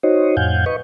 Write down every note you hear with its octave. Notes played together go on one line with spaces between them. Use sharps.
D#4 F#4 C5 C#5 D#5
F2 A2 F5 F#5 G#5 G6
B4 D#5 C#6